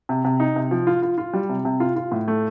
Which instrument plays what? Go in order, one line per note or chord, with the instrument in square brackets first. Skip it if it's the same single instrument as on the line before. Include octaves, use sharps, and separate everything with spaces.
[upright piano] C3
C3
D#4
C3
F3
F4
F4
F4
G3
C3
C3
F4
F4
A2
A3